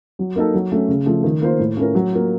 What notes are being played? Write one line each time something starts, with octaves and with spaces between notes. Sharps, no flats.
F#3
A#3 D#4 A4
F#3
A3 C#4
C#3
F3 A3
D#3
A#3 F4 C5
A2
A3 C#4 F4 A#4
F#3
A#3 F4